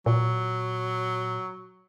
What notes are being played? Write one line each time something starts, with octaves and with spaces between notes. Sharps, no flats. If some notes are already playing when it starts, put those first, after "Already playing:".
A#2 F#3